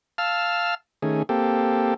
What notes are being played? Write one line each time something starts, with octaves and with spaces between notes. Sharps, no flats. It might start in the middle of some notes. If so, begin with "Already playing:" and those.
F5 A5 E6 F6
D#3 A3 C#4 G#4
A#3 C4 G4 A4